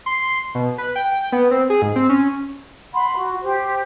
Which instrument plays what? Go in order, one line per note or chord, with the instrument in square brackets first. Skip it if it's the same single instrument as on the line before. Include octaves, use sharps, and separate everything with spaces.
[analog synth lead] C6
B2
B4
G5
G5
B3
C4
G#4
G#2
C4
C#4
[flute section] F#5 B5 C6
F#4
G4 C5